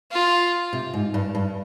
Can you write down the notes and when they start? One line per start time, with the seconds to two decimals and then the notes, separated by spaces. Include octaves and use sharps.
0.12 F4
0.73 C3
0.94 G#2
1.14 G2
1.35 G2